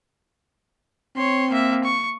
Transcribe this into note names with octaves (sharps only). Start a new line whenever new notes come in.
C4 C#5 C6
A#3 E5
C#6